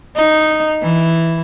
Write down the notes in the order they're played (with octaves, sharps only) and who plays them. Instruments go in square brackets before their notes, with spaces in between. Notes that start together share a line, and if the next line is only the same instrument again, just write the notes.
[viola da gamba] D#4
E3